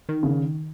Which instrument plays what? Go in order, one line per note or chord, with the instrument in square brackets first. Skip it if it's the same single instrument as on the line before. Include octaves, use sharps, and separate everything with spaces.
[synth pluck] D#3
[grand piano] C#3